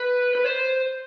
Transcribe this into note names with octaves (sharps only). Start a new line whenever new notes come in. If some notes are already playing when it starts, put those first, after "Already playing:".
Already playing: B4
B4
C5